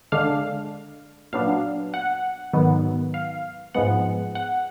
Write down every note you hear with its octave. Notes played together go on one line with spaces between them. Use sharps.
D3 G#3 D4 F5
A#2 F#3 B3 D4 F5
F#5
G#2 D#3 F#3 B3
F5
G#2 F3 G#3 B3 F#5
F#5